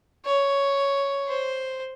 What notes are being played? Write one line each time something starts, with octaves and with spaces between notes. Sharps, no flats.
C#5
C5